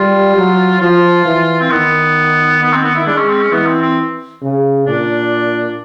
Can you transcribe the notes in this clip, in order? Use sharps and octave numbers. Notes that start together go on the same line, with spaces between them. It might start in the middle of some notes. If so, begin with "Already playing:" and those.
Already playing: G3 F4
F#3
F3 F4
E3
C4
D#3 B3
B3
C4
B3
E4
G#3 D4
C#4
C4
C#4
E3 B3
C4
C4
C#3
A#2 D4